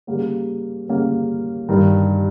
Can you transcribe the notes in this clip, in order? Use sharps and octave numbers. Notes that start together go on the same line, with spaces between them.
C#3 G3 A#3 C#4
C#3 G3 A#3 C#4
G2 D#3 G3